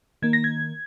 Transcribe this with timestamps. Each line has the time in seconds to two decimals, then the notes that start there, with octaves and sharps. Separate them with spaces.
0.22 D#3 A#3 G#6
0.33 A#6
0.44 G#6